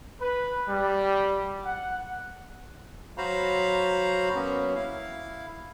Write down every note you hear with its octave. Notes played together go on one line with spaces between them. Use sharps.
B4
G3
F#5
F#3 F#4 C5 F5 A#5 B5
F#3 A#3 B3 C#4
E4 F5